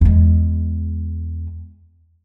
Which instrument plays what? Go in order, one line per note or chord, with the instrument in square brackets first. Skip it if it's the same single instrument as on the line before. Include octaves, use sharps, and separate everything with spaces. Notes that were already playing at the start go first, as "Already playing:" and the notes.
[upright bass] E2 G#3